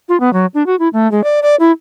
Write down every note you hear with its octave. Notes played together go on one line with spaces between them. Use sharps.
F4
B3
F#3
D4
F#4
E4
A3
G#3
D5
D5
E4